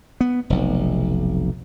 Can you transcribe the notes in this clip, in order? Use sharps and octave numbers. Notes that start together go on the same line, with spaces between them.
B3
F1 B1